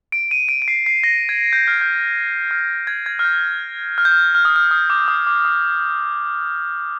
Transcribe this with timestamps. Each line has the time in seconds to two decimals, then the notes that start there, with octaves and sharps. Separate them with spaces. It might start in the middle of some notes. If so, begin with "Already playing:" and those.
0.12 D7
0.31 D#7
0.49 D7
0.62 D7
0.68 C7
0.86 C7
1.04 A#6
1.29 G#6
1.53 G6
1.68 F6
1.81 G6
2.51 F6
2.87 G#6
3.06 G#6
3.19 F6
3.25 G6
3.98 F6
4.05 G6
4.12 F6
4.35 F6
4.45 D#6
4.56 F6
4.71 D#6
4.90 D6
5.08 D#6
5.27 D6
5.45 D#6